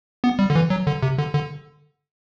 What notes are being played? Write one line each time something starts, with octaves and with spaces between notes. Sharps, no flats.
B3
G3
D3
E3
F#3
D3
C3
D3
D3